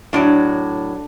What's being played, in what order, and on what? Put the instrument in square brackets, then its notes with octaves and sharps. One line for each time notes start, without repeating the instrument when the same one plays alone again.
[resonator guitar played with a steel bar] A2 F#3 D4